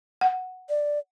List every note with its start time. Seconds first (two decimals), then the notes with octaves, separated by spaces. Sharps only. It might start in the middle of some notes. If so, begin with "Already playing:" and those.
0.21 F#5
0.69 D5